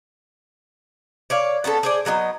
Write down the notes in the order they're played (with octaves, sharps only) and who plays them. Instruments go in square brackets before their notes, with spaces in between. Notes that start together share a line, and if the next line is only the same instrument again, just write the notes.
[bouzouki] C#5 D5 F5
B3 C#4 G#4 A4
G#4 C5 D5
D3 F#3 B3 D#4